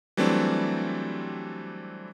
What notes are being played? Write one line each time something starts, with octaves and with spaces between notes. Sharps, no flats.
E3 F#3 G3 A3 C4 D4